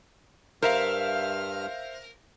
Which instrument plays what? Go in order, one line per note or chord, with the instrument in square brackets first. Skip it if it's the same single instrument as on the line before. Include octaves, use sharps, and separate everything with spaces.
[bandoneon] G2 F6 [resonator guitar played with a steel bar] A#4 [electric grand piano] C5 E5 F5